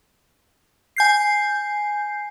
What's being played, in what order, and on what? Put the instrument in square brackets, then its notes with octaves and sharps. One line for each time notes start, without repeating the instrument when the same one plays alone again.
[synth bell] G#5 G6 C7